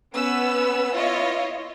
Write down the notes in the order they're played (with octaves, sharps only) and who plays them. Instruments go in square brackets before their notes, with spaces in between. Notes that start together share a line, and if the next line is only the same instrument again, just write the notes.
[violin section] B3 C#4 B4 E6
E4 F4 C#5 D#5